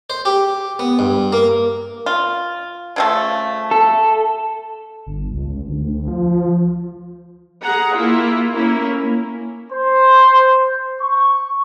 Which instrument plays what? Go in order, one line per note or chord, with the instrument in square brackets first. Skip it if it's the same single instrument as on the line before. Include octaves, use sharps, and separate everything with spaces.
[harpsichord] C5
G4
B3
G2
A#3
[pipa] F4
C#3 F3 A3
[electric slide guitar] A4
[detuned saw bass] G1
C#2
C#2
D2
F3
[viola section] G#4 F#5 A#5
A#3 E4 F4
A#3 C#4 E4
[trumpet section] C5
C#6